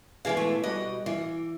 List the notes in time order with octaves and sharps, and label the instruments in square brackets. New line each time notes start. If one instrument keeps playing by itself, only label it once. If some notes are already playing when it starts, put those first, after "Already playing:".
[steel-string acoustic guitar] B2 E3 G#3 [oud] G#4 F5
[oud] A3
[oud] B2 G3 F#4 [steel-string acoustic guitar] D#5
[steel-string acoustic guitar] E3 [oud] F4